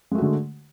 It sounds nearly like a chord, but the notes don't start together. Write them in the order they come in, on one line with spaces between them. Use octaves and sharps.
G#3 A3 F#4 D3